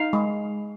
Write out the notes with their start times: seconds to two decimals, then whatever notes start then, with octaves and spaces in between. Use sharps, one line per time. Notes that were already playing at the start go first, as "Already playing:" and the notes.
Already playing: D#4 F5
0.13 G#3